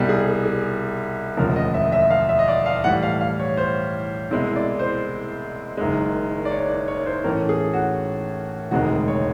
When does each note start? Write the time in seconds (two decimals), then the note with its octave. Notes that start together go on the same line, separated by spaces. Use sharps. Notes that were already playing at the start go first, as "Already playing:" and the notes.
Already playing: C2 B2 G3
0.09 G#4
0.27 G#4
0.45 G#4
1.37 E1 D2 C#3 F3 A#4
1.56 D#5
1.74 E5
1.92 E5
2.10 F5
2.29 E5
2.39 D#5
2.48 D5
2.66 F5
2.84 A2 E3 G3 F#5
3.03 F5
3.21 F5
3.39 C#5
3.57 C5
4.31 C2 B2 G#3 C4 E4
4.56 D5
4.79 C5
5.77 F#1 F#2 D#3 G#3
6.45 D5
6.51 C#5
6.69 D5
6.88 C#5
7.06 C5
7.24 A2 E3 A3 C#4 A#4
7.49 G#4
7.73 F#4
8.71 E1 D2 C3 D#3 G#3 F#4
9.08 C#5